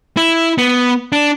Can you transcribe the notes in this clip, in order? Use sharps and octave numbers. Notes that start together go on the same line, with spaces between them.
E4
B3
D4